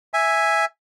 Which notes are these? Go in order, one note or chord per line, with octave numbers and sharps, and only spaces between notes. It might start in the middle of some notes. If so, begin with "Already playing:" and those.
E5 G#5